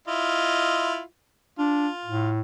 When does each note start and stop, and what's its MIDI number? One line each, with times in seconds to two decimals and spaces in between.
0.08 1.01 64
0.08 1.01 65
0.08 1.01 75
1.59 1.88 62
1.59 2.29 65
2.05 2.42 45